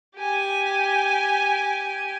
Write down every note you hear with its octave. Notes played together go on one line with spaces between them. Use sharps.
G4 G#5